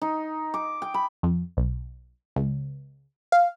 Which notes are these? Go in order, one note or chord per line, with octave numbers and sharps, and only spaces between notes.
D#4
D6
G5
B5
F2
B1
C#2
F5